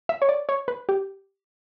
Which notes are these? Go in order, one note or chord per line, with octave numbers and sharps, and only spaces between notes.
E5
C#5
D5
C#5
B4
G4